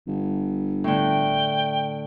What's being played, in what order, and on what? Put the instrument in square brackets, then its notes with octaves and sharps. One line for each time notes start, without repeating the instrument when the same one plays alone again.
[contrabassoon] G1
[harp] A2 D3 [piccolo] G5